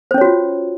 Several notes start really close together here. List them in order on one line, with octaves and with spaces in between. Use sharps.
C5 C#4 C#5 F#4 F4